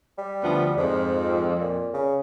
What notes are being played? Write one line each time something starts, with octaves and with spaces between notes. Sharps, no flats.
G3
D2 F3 B3
F2 G#2
A#2
C#3